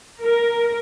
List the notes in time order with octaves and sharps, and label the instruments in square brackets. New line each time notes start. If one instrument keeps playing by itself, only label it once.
[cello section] A#4